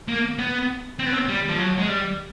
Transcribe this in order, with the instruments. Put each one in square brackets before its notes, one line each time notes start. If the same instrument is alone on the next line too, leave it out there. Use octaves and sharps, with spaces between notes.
[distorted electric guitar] A#3
B3
C4
B3
C4
G3
F3
F#3
G#3
G3